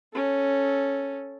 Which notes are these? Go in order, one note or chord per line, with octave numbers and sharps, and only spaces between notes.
C#4 A4